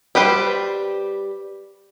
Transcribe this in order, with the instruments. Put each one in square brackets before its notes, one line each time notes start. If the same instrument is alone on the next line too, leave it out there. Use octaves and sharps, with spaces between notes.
[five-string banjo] G3 G4 B4 C5